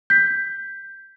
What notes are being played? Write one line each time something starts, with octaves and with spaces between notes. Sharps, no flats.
G6 B6